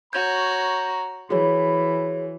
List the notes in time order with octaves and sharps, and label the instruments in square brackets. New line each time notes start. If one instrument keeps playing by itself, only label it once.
[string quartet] F#4 C#5 [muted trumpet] A#5 [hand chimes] G6 G#6
[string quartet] E3 [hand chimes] F#4 G#4 C#5 [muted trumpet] B5